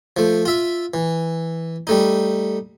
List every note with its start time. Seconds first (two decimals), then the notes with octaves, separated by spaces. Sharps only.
0.17 F3 A3
0.45 F4 E5
0.94 E3
1.87 G3 A3 D#4